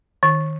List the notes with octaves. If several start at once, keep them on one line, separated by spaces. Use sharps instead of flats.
D#3